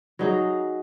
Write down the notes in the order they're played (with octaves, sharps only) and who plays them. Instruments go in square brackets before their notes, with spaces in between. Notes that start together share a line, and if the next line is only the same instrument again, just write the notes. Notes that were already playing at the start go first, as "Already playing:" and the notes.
[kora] F#3 D#4 G#4